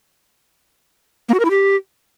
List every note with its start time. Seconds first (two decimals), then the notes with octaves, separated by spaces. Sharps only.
1.29 A#3
1.34 F#4
1.40 A#4
1.45 E4
1.50 G4